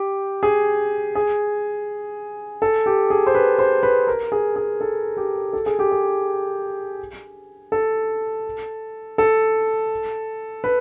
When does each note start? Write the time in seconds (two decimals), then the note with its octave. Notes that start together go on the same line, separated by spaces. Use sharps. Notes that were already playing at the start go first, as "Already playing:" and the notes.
Already playing: G4
0.43 G#4
1.15 G#4
2.62 A4
2.86 G4
3.10 G#4
3.27 C5
3.34 B4
3.59 C5
3.83 B4
4.07 A#4
4.32 G#4
4.56 G#4
4.81 A4
5.17 G4
5.53 A4
5.66 G#4
5.79 G4
5.91 G#4
7.72 A4
9.18 A4
10.64 B4